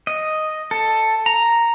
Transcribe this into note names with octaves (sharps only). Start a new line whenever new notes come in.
D#5
A4
A#5